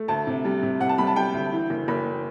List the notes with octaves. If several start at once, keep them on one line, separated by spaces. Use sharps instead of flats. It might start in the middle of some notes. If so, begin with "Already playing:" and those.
Already playing: A3
D2 A5
C3
G3
C3
C3 F#5
A5
G3 B5
A5
G3 G5
D2
E3
F#1
F#1 B5